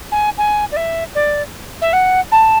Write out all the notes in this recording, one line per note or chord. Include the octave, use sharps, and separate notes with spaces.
G#5
G#5
D5
E5
D5
E5
F#5
A5